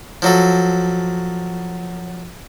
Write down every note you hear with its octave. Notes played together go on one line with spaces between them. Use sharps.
F3 F#3 A4